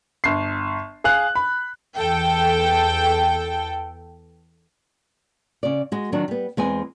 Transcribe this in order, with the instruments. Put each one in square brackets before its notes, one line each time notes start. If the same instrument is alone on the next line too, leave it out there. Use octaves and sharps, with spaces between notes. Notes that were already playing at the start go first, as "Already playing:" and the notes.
[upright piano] G1 C7
G#4 F5 F#6
B5
[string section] E2 A4 G5
[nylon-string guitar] C#3 D5
G#3 F#4
D#3 F#3 D4
G3 B3
E2 G#3 C4 G#5